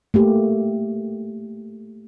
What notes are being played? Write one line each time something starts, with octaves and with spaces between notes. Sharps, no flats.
A3 A#3 G4